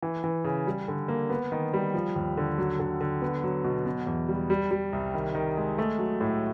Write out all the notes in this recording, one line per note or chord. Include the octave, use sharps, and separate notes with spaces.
E3
E3
C#3
G3
D3
A#3
B3
D#3
G3
F3
D#2
D3
F#3
D3
D3
B3
F#3
B2
B2
E2
G3
G3
G3
C2
D#3
D#3
G#3
A3
F#3
A2